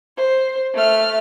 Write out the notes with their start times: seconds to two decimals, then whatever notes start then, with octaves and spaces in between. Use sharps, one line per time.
0.17 C5
0.74 A3 F6